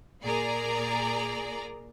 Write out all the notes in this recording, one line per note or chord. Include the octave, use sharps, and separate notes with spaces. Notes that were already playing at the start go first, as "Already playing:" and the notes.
A#2 G#4 A#4 D5 A#5